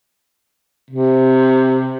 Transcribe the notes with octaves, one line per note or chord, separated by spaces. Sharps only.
C3